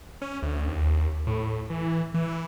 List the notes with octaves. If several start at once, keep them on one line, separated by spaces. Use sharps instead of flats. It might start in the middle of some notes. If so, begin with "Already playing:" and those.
C#4
D2
D#2
A2
E3
E3